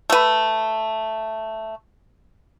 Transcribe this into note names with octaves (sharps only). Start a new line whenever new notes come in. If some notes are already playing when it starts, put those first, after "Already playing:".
A3 B4